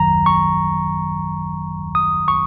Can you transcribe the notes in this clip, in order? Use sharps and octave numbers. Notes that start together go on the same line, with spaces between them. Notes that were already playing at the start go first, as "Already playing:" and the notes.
Already playing: G#1 F#2 D#3 F#3 A#5
C#6
D#6
C#6